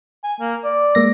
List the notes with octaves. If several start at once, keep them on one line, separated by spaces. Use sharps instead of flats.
G#5
A#3
D5
G#3 A#3 A#6